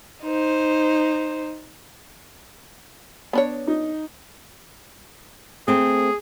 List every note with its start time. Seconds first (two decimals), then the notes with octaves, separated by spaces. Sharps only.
0.23 D#4 C5
3.33 B3 D4 C#5
3.67 D#4
5.68 A3 C4 G#4